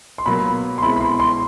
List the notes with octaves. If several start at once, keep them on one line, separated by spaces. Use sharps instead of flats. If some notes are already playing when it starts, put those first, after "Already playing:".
C6
B2 F#3 A#3 B5
C6
B2 G#3 C4 E4 B5
B5
C6
C6